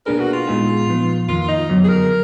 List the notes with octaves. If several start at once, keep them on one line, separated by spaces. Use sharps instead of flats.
B2 A#3 D4 G#4 A#4 B4
F#4
F4
A#2 G#3 B3 D#4 G#4
A#2 F3 B3
F2 D#3 A#3 F4
D#4
F#2 D3 F#3 B3
G#4
A#4